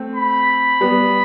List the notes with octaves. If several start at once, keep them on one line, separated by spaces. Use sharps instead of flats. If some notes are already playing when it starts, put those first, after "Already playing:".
Already playing: A3 C4
B5
G3 B3